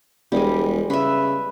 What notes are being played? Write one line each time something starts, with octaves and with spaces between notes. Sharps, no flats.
E1 G3 G#3
C#3 B4 E5